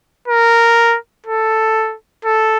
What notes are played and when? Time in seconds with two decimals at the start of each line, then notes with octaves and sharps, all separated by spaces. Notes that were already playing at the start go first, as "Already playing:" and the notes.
0.28 A#4
1.27 A4
2.25 A4